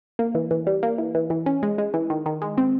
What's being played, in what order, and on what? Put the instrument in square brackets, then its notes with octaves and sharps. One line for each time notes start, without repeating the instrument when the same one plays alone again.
[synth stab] A#3
E3
E3
G3
A#3
E3
E3
E3
C#4
G#3
G#3
E3
D#3
D#3
G#3
C4